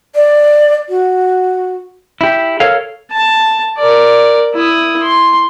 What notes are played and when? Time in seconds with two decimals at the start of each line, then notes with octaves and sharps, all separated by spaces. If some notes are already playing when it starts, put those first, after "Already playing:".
0.15 D5
0.89 F#4
2.21 E4 G4
2.60 A4 A#4 C#5 F5
3.11 A5
3.78 A#4 D5
4.54 E4 D#6
5.02 C6